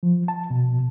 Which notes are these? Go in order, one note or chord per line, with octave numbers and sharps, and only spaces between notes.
F3
A5
B2